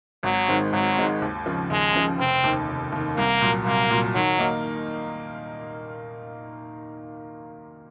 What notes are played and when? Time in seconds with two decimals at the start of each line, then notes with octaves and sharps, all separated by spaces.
0.23 G#1 F#3
0.48 G#2 D#3 G#3 C4
0.73 G#1 F#3
0.97 G#2 D#3 G#3 C4
1.22 D#2
1.46 C#3 F3
1.70 D#2 G#3
1.95 C#3 F3
2.19 F1 C4
2.44 D#2 D#3
2.68 F1
2.92 D#2 D#3
3.17 C2 A#3
3.41 A#2 F#3
3.66 C2 A#3
3.91 A#2 F#3
4.15 D#3 F#3
4.39 A#3 D#4